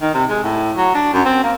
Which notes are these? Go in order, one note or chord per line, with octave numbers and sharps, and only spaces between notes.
D#3
C3
G#3
A2
F#3
D4
F#2
C4
A#3